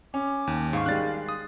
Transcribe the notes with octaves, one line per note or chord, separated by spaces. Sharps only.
C#4 D6
D#2
G#2 F5 C#6
D#3 G3 G#3 F#6 A6
D#6